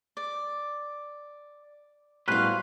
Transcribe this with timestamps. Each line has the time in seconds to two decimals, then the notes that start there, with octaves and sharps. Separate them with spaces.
0.17 D5
2.28 A2 F#3 G3 B3 C#4 B4 C5 F5